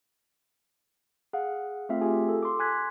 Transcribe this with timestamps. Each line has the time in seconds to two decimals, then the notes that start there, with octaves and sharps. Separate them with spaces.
1.33 G#4 F5 F#5
1.89 A3 C4 F4 E5 F5
2.01 F4 G4 G#4 G#5
2.29 A4
2.43 C6 D6
2.59 G#5 C6 F#6 G#6 B6